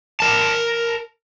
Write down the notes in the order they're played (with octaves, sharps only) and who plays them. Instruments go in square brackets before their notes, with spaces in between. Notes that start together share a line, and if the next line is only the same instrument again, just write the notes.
[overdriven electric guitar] A#4 A5